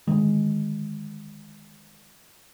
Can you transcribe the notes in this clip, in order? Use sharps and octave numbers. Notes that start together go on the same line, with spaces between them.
D3 D#3 G#3